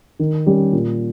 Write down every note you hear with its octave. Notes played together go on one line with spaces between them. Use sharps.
D#3
G3 C#4 G4
A#2